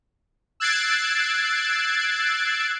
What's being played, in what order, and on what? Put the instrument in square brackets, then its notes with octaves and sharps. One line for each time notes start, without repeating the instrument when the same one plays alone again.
[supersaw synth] E6 F#6 G#6 A6 C7 D7